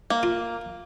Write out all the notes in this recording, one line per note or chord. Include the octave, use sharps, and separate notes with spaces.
A#3
F4